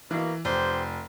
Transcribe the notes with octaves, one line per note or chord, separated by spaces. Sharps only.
B2 E3 A#3
F1 G4 C5